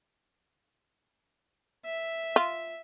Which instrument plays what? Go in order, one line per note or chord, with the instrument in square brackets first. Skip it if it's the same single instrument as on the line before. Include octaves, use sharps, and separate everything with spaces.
[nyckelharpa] E5
[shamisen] F4